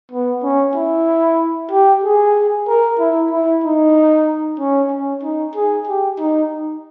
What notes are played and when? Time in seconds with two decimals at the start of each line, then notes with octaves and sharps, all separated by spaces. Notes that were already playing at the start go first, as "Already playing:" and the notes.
0.11 B3
0.43 C#4
0.76 E4
1.71 G4
2.03 G#4
2.68 A#4
2.99 E4
3.31 E4
3.64 D#4
4.59 C#4
4.92 C#4
5.23 D#4
5.55 G#4
5.87 G4
6.19 D#4